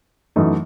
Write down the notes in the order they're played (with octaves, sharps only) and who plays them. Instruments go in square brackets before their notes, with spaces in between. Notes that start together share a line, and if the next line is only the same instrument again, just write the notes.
[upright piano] F#2 E3 A3 D#4